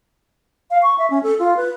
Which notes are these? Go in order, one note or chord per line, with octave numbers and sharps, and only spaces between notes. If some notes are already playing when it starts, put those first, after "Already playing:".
F5
C#6
E5
C#4
A4
F4
B4